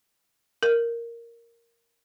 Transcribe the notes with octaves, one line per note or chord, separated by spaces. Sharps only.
A#4